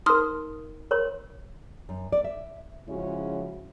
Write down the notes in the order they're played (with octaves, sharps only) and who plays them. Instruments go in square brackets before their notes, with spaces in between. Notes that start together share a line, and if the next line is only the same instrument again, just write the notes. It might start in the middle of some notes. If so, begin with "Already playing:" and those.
[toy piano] D#4 A#4 [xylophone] C6 D#6 F6
[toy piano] A#4 C#5 C6
[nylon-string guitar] F#2
D5
E5
[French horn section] C#3 F3 G#3 C#4 E4 F#4